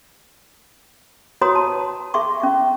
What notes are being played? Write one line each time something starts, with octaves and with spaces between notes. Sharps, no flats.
F#4 B4 C#5 A#5 C6 D#6
A5
G#4 E5 C6 C#6
C#4 E5 C#6